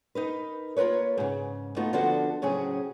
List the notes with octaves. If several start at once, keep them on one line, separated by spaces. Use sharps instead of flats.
D#4 A#4 B4
A#3 F4 A#4 B4 C#5
G#2 C#3
A3 B3 D#4 F4 F#4
D3 F3 B3 D4 F#4 A4
A2 C#3 F#3 C4 C#4 G#4